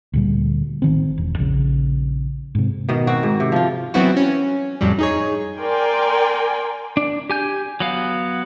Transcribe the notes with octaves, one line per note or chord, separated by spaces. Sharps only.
D2 A#2 G3
A1 D#3 C4
E1
A#1 C#3
G#2 C3
B2 D#3 D#5
C4 F#4
G#2
C3
F3 F4
E3 F#3 B3 C4 E4 F#4
C#4
F2 A2 F#3 G3
D#4 G#4 C#5
A#4 D5 G5 G#5 C6
D4
G4 G#5 G6
F#3 B3 F5